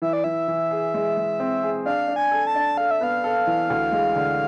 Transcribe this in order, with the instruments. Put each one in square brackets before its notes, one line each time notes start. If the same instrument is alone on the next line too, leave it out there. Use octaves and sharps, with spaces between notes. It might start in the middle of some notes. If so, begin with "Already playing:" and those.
[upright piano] E3 [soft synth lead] E5
[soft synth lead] D5
[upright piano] E3 [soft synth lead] E5
[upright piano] E3
G#4
G#3
G#3
C4
G#4
[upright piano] D4 [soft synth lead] F5
[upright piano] D4
[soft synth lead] G#5
[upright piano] A4
[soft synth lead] A5
[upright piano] D4
[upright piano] A4 [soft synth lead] F5
[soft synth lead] E5
[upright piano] B3 [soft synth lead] F5
[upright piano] A4
E3
D2
G#3
D3